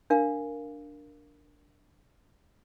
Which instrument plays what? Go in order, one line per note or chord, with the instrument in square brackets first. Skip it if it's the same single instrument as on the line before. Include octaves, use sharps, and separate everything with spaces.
[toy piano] D4 A#4 F5